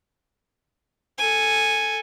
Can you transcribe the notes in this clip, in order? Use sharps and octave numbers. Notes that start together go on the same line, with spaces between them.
A4 G#5